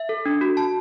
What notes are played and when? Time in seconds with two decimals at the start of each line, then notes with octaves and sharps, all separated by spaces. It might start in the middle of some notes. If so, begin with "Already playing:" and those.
Already playing: E5
0.09 A4
0.26 D4
0.41 F#4
0.57 A5